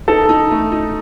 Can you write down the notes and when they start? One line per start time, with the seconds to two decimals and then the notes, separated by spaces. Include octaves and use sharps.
0.08 D#4 A4
0.29 D#4
0.51 A3
0.72 D#4